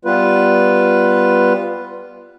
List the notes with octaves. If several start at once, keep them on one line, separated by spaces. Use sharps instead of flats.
G3 B3 F4 B4